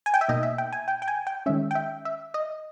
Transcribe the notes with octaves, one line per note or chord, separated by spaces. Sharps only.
G#5
G5
E5
B2 A#3 D#4 D#5
E5
G5
G#5
G5
G5
G#5
G5
D#3 G#3 C#4 E5
G5
E5
E5
D#5